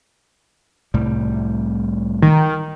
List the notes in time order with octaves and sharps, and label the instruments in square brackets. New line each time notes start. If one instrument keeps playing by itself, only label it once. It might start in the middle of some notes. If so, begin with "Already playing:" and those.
[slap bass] C2 A2 G3
[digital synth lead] D#3